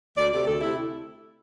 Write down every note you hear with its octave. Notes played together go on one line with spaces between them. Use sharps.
D2 D5
C3 A3 D5
D2 A4
C3 A3 E4